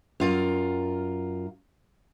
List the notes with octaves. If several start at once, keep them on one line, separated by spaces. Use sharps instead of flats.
F#2 F4 A#4